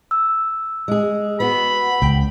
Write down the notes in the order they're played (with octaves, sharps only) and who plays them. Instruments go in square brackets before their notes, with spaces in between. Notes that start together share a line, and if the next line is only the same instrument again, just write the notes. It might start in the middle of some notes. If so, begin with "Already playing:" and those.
[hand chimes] E6
[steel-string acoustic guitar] G#3 G#4
[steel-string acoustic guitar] B3 F#4 [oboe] B5
[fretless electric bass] C#2 [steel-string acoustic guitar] G5